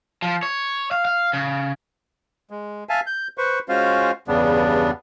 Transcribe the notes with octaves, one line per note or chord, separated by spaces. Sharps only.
F3
C#5
F5
F5
C#3
G#3
E5 F5 G#5 A5
G6
B4 C5 C#6
G#3 C#4 F4 F#4 C5 F5
E2 G2 C#3 G3 B3 D4